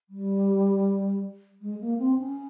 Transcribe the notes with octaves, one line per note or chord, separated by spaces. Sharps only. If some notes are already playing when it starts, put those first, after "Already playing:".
G3
G#3
A#3
C4
C#4